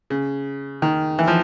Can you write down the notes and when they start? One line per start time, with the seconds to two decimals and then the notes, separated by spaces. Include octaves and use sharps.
0.10 C#3
0.82 D#3
1.19 E3
1.27 F3